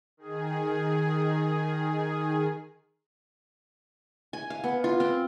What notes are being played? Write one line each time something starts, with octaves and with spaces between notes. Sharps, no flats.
D#3 G#4
G#5
F5
B3
F4
C4